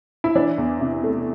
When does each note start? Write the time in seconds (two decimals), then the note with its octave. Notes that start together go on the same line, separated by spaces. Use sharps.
0.24 E4
0.35 E3 D4
0.58 E2
0.81 C3
1.04 A3